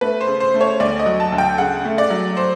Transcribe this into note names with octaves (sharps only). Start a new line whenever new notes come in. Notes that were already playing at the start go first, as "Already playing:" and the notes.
A3 B4
C5
C#3
C5
A3
C#5
D2 D5
D#5
F#3
A5
D2
G5
C#3 F#5
A3
D5
F#3
C5